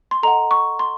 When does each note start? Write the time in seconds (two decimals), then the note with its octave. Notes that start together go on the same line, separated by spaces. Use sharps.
0.11 C6
0.23 A4 D#5 F#5 A#5
0.51 C#6
0.79 C6